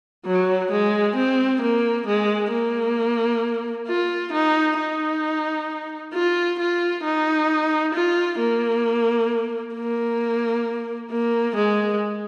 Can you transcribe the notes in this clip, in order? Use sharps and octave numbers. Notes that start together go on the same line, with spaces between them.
F#3
G#3
C4
A#3
G#3
A#3
F4
D#4
D#4
F4
F4
D#4
F4
A#3
A#3
A#3
G#3